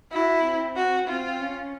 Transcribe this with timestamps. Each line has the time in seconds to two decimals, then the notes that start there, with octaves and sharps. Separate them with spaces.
0.12 E4 F#4
0.44 C4
0.76 F#4
1.08 C4 F4
1.41 C#4